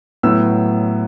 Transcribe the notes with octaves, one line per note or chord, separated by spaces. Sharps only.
A2 F#3 B3 E6